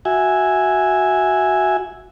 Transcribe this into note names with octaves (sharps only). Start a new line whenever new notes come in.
F#4 E5 G#5